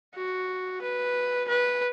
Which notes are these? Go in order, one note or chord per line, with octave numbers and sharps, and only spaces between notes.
F#4
B4
B4